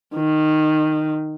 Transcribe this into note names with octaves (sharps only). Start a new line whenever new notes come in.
D#3